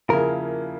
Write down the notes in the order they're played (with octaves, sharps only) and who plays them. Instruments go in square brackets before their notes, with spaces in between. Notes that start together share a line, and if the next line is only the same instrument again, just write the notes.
[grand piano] C#3 F3 A#3 E4 G#4 [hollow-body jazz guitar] A#4